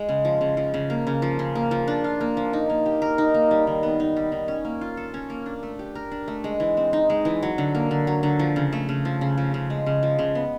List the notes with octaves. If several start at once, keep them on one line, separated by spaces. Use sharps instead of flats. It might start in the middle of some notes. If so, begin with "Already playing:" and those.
Already playing: G#3
C#3
F3
C#3
F3
C#3
A#3
C#3
F3
C#3
A#3
F3
D4
F4
A#3
F3
D#4
A#3
G4
A#4
D#4
A#3
G3
D#3
B3
D#4
G3
D#3
C#4
A#3
F4
A4
C#4
A#3
D4
A3
G4
A#4
D4
A3
G#3
E3
C4
D#4
G#3
E3
F#3
D3
A#3
D3
F#3
D3
F3
C#3
A3
C#3
F3
C#3
F3
C#3
G#3
C#3
F3
C#3
B3